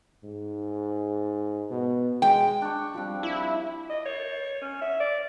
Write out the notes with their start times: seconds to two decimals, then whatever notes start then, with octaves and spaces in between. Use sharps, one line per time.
0.24 G#2
1.70 B2
2.22 G#3 G5
2.62 D4 C#6
2.94 F3 G3 C4
3.23 E4
3.90 D#5
4.06 C#5
4.62 C#4
4.81 E5
5.00 D5